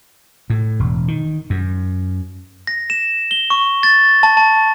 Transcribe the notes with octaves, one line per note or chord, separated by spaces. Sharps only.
A2
E1
D#3
F#2
A#6
E7
G7
C#6
A6
A5
A5